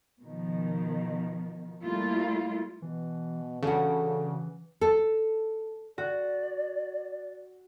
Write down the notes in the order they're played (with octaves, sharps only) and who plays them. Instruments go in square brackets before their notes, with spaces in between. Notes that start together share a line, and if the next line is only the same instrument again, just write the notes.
[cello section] B2 D#3 F3
G3 A3 A#3 E4 F4
[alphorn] B2 [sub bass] E3
[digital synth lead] C#3 [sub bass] E3 [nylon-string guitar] D4 F#4 [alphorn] A4
[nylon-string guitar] A4
[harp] F#4 [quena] D5